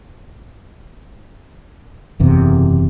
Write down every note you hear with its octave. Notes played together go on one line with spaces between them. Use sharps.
F#1 E2 C3